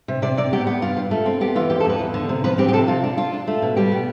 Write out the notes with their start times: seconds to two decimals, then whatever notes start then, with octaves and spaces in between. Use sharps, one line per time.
0.08 C3
0.22 C3 D5
0.37 C3 D5
0.53 B3 G4
0.67 B3
0.82 G2 F4
0.97 G2
1.11 A3
1.26 C4
1.41 B3 G4
1.55 E3 F4
1.70 F2 G4
1.80 A4
1.85 F2 B4
1.99 E2
2.14 D3
2.29 C3
2.44 F3 B4
2.58 C4 G4
2.68 G4
2.73 C3 A4
2.88 C3 F4
3.03 D4
3.17 D4 F4
3.33 D4
3.47 A3
3.62 B2
3.76 G3 G4
3.92 B3